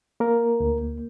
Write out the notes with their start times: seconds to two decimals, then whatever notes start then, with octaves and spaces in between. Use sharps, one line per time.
0.20 A#3 A#4
0.60 D2